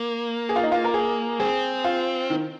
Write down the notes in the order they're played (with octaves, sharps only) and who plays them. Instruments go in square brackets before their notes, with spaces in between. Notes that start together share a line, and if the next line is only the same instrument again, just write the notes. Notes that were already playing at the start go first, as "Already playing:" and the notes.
Already playing: [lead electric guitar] A#3
[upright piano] G#4
F4
D#4
F4
A#4
G#4
[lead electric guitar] C4 [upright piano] G#4
[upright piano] F4
D#3